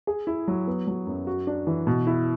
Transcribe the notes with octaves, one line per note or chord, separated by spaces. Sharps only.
G#4
E4
F#3
B3
F#3
F#2
F#4
D4
E3
B2
E4